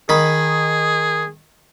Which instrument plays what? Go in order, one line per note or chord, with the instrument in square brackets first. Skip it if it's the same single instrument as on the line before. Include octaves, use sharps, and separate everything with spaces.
[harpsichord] D#3 B5 [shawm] G#4